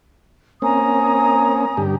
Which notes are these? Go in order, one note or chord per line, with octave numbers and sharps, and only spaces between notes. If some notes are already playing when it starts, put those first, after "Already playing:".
A#3 C4 C#4 G#5 A#5 D#6
G2 D3 G4